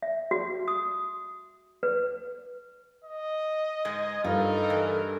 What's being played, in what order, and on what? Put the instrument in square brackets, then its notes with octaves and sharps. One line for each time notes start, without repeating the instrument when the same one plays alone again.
[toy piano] E5
F#4
D#6
B4
[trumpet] D#5
[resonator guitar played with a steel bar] G#2 G#3
[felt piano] G2 [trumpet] D#4 [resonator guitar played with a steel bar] F4 [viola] A4 A#4
[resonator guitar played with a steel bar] E3